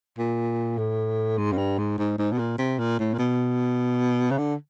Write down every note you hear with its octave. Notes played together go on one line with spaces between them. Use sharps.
A#2
A2
G#2
F#2
G2
G#2
G#2
G#2
B2
A#2
C3
A#2
A2
A#2
B2
C#3
D3